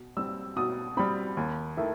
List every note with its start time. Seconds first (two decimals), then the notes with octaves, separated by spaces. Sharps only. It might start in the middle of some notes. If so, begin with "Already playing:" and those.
Already playing: B2
0.17 G3 C4 E6
0.56 B2 D#6
0.97 G3 C4 B5
1.37 D#2
1.77 D#3 A3 E4